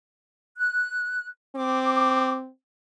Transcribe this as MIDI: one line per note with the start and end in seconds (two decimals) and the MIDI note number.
0.58 1.26 90
1.56 2.49 60
1.56 2.33 86